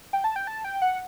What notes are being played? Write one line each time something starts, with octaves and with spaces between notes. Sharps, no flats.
G5
A5
G5
A5
G5
F#5